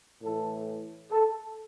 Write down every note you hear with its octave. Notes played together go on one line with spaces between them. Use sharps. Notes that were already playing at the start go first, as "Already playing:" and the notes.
A2 E3 A4
A4